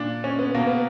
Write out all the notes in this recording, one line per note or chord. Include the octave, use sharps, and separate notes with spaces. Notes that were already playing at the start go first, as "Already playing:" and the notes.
Already playing: A#2 D4
C#4
B3
B2 A#3
B3